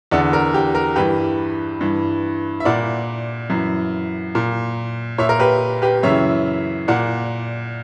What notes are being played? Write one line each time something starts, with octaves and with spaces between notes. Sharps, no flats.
E2 D3 D5 F#5
A#4
G4
A#4
G2 E3 G4 B4
G2 E3
E5
A#2 D5 F#5
F#2 E3
A#2
A#2 C#5 E5
A#4
G4 B4
G4 B4
F#2 C#3 E3 C#5 E5
A#2 D5 F#5